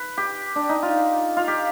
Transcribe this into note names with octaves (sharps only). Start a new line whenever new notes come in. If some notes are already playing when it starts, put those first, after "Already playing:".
Already playing: B4
G4
D4
D#4
F4
F4
G4